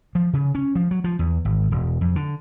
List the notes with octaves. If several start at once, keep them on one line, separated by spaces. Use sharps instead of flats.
F3
C#3
C#4
F3
F#3
F3
E2
G#1
E1
F2
D3